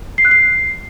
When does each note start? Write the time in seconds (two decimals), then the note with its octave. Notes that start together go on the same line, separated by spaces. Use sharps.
0.18 C7
0.25 F#6
0.31 C7